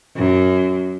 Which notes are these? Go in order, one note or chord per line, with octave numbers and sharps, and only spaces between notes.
F#2